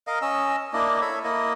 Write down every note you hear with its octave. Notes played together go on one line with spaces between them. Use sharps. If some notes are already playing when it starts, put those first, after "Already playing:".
A#4 D#5 F5
C#4 D#5 E6
A#3 D4 E4 D#5
A4 C#5 B5
A#3 E4 D#5